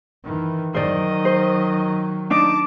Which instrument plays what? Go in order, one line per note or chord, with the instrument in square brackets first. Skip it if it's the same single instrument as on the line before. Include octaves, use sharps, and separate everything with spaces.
[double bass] D#3 E3
[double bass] D#3 F#3 [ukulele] C5 D5 [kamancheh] D#5
[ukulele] C5
[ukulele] D4 D#4 [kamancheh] A5 D6